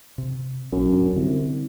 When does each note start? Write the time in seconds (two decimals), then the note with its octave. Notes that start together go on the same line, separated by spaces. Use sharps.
0.18 C3
0.72 A#1 F#2
0.93 D#1 G#2 D4
1.16 C2 D3